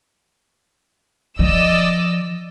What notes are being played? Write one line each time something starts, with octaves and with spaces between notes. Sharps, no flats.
F3 D5 D#5 E6